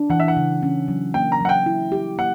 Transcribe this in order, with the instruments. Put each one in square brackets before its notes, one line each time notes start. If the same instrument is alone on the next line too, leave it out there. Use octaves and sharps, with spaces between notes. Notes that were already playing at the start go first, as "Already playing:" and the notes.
Already playing: [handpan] D4
[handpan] E3 [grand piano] F#5
[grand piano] E5
F#5
[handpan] C#3
C#4
F#3
[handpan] A#3 [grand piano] G5
[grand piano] A#5
[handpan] F#3 [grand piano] F#5
[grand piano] G5
[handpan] E4
G4
[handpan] A#3 [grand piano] F#5